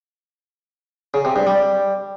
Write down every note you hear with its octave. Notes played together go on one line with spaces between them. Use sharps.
C#3
C3
G2
G3